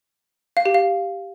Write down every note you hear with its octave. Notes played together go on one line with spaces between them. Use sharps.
F5
G4
F5